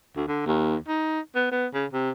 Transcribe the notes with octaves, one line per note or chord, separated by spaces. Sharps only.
D2
D3
D#2
D#4
B3
B3
C#3
C3